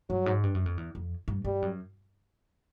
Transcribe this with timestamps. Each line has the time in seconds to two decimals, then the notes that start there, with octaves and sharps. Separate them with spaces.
0.10 G2 F#3
0.26 G#2
0.43 G2
0.55 F#2
0.66 F2
0.77 E2
0.95 F2
1.28 G2
1.45 G2 G3
1.62 F#2